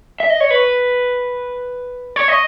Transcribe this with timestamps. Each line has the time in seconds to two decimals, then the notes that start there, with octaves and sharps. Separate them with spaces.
0.20 E5
0.30 D#5
0.40 C#5
0.51 B4
2.16 C#5
2.28 D#5